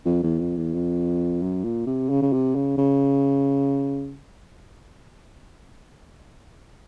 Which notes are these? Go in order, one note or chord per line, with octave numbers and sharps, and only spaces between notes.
F2
E2
F2
E2
F2
F#2
A#2
C3
C#3
C#3
C3
C#3
C#3